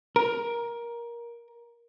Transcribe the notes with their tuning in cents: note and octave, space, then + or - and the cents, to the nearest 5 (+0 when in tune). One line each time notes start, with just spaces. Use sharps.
A#4 +15